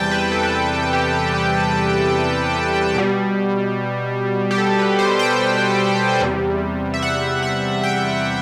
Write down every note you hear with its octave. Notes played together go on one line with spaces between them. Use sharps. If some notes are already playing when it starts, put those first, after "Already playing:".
Already playing: E2 C3 E3 G3 G5 A5
B4
A4
B4
A4
G4
G4
B2 G3
G4
A4
B4
C5
G5
E2 C3 G3
E5
F#5
F#5
G5